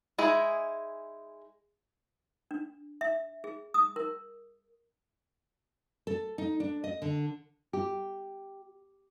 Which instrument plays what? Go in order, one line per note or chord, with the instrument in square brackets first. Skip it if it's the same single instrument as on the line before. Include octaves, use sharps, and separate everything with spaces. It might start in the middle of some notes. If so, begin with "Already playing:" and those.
[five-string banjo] G#3 D#4 E4 G#4
[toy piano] D4
E5
G#4
D#6
A#4
[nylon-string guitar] A4
D#4
D4
D#5
D3
G4